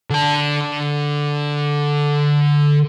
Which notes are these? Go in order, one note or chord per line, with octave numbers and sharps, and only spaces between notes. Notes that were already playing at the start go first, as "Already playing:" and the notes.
D3 A5